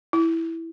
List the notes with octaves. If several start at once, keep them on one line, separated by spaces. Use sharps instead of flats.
E4